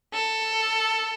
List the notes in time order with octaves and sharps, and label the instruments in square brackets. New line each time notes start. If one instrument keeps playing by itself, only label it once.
[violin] A4